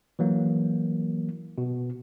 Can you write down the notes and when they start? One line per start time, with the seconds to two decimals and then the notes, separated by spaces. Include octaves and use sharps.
0.19 E3 F#3 A#3
1.58 B2